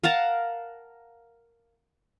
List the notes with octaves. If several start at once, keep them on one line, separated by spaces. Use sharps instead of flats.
A#4 F5 F#5 A5